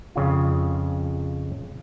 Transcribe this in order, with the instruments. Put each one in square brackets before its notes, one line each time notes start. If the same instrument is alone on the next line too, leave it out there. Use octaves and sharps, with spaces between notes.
[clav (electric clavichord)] F2 C#3 F4